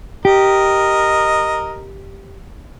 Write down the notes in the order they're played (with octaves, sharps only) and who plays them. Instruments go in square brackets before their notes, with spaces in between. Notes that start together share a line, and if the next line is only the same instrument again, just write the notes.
[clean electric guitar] G4 [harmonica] A#4 D#5